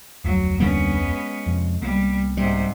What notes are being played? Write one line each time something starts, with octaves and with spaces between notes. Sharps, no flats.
F1 D2 F#3
D3 G3 A#3 B3 C#4
G#3
F2 C3
C2 G3 A#3 B3
G#2 C3 G3